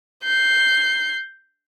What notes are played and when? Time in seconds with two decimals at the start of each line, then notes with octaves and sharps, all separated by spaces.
0.24 G6 C7